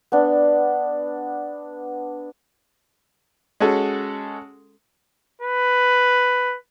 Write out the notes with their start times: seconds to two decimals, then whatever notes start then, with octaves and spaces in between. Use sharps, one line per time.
0.12 B3 D4
3.60 G#3 C#4 F#4 G#4 A4
5.42 B4